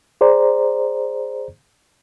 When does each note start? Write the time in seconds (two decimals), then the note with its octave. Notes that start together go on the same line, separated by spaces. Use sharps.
0.21 G#4 C5 D5 A#5